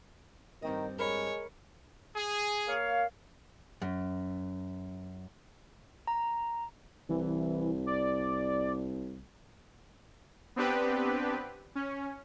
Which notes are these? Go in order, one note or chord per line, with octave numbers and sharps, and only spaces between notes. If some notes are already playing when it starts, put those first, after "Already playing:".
G2 D#3 C4 D#5
G#3 A#4 C#5 B5
G#4
A#3 C#5 F5
F#2
A#5
C2 E3
D5
B3 C4 D4 G4 B4
C#4